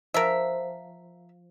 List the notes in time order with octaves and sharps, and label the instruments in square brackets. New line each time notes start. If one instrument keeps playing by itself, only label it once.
[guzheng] F3 [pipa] A#4 E5